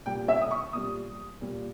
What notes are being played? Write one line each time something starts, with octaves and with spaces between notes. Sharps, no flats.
A#2 G3 G5
E5
D#6
C#6
A#2 G3 D#6
A#2 G3